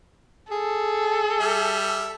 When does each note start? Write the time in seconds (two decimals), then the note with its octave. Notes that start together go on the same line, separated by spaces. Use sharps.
0.51 G#4 A4
1.40 G3 E5